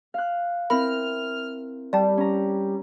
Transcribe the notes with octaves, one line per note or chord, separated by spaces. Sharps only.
F5 F#6
C4 E4 A#4 B5 F6
G3 D5 A5
C#4 A#5